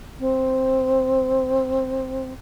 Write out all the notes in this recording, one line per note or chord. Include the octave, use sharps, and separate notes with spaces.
C4